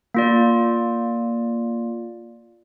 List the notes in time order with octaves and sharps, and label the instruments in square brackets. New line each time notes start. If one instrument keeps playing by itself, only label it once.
[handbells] A#3 F4 D5